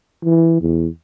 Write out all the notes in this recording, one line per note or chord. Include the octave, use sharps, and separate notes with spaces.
E3
E2